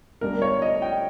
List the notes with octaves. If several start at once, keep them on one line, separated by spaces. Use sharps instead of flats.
G1 G2 G3 A#4
C#5
D#5
G5